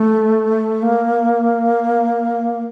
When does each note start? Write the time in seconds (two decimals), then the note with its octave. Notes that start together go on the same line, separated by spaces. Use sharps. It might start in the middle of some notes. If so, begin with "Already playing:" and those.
Already playing: A3
0.82 A#3